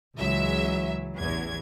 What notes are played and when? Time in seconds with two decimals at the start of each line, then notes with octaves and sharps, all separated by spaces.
0.18 C#2 E3 F#3 G#3 E5
1.18 A1 E2 G#6